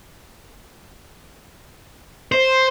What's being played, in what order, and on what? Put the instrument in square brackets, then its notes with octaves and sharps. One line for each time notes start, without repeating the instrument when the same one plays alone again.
[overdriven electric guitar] C5